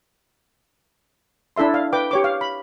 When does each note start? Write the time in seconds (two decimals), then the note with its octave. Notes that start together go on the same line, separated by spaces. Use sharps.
1.56 D4 E4 A4 E5 C6
1.74 F5
1.93 B4 G5 D6
2.11 G4 C#5 D6
2.24 F5
2.41 B5